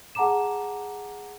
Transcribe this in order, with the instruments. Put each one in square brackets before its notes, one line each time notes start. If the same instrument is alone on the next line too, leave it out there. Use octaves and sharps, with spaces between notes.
[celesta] G#4 F#5 A5 A#5 D6 E7